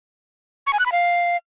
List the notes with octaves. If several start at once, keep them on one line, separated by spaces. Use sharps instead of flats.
C#6
G#5
F#6
B5
F5